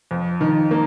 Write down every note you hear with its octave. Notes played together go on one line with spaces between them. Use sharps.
F2
D#3
A#3